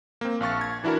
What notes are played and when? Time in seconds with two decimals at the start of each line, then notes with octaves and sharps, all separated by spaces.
0.21 A#3 C4
0.41 A#1 F5 C#6 A6
0.61 G#6
0.84 E3 D4 E4 F#4 A#4